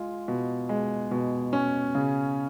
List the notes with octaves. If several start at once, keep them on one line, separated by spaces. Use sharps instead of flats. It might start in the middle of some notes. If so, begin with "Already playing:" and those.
Already playing: G#3 F4
B2
G#3
B2
C#4
C#3